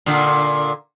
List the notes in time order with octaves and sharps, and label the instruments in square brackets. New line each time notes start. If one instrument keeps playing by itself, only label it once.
[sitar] A#2 D3